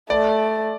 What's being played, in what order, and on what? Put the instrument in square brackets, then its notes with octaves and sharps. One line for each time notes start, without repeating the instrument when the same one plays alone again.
[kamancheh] A3 [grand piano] D5